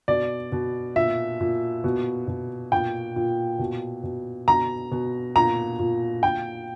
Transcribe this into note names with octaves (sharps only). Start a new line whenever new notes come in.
B2 D5
B2
A#2 E5
A#2
B2
B2
A#2 G5
A#2
B2
B2
B2 A#5
B2
A#2 A#5
A#2
A#2 G5